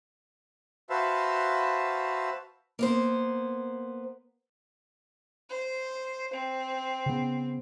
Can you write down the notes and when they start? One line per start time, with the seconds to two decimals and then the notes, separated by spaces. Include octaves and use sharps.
0.90 F#4 B4 C5 E5 F5 A5
2.79 A#3 B3 C5
5.50 C5
6.33 C4
7.06 C#3 B3